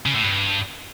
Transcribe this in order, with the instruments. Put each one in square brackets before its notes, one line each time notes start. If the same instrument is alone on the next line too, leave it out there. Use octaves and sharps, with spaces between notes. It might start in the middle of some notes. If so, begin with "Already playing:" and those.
[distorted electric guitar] C#3
A2
G2